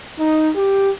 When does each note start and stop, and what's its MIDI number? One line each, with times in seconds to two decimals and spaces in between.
0.19 0.48 63
0.56 0.90 67